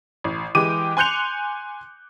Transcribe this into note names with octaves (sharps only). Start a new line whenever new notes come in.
A1
E3 G#3 G4 D6 D#7
G#5 C6 F#6 G6 C#7 F7